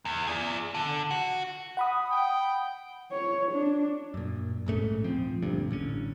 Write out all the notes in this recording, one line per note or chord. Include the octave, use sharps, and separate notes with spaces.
E2
G#4 D5
D3
F#4
F#5 B5 D#6
G5
C#5
D4
F#2 A#2
A#1 G#2 A3 C#4
D#1 F3 C4
D2 G2 A#2
A1 D3 C#4